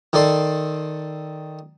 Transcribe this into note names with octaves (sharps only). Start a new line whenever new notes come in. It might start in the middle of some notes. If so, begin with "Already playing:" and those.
D#3 A4 D5 C6